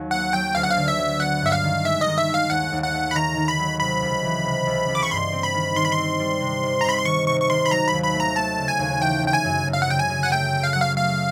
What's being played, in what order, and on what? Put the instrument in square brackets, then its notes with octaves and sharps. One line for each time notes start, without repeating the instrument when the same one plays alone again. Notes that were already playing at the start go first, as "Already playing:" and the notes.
Already playing: [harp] D#2 F#3
[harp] A#3 [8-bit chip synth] F#5
[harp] F#3 [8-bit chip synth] G5
[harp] D2 [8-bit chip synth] F5
[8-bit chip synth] F#5
F5
[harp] D3
[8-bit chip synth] E5
[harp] F#3
[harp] B3 [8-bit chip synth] F#5
[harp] G2 [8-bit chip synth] E5
[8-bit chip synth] F5
[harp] D#3
[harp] G#3 [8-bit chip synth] E5
[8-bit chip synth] D#5
[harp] D#3
[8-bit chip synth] E5
[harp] G#3
[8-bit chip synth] F5
[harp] D#2 [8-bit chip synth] F#5
[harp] D#2
[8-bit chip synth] F#5
[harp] A3
[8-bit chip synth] B5
[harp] D#3 [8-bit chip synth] A#5
[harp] D#3
[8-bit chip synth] B5
[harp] F#3
[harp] C3 [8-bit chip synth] B5
[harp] C#2
E3
C3
C#2
C#2
[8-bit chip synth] D6
C#6
[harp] G2 [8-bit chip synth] C6
[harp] C4
[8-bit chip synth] B5
[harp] D#3
[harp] D#3 [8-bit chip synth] C6
[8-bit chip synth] B5
[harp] C4 [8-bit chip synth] C6
[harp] G3
C3
D#3
[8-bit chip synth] A#5
[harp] C3 [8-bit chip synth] B5
[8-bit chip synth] C6
[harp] D#3 [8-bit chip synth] C#6
[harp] C3 [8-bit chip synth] C#6
[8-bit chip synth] C#6
[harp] D#3 [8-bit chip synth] C6
[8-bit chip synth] B5
[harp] F#3 [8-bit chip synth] A#5
[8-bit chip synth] B5
[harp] D#2
[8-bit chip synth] B5
[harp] A3
[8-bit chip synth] A#5
[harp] A3 [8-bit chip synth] A5
[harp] C#3
[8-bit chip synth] G#5
[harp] D#2
[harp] E3 [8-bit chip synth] G5
[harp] C#3 [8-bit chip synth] G5
[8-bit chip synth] G#5
[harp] F#2
F#2
[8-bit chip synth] F5
F#5
[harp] C#3 [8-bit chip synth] G5
[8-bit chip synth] G#5
[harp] C#3
[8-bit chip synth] F#5
[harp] A3 [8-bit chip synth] G5
[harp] A3
[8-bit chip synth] F5
[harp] F#3 [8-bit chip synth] F#5
[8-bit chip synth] F5
[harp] A3 [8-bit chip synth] F5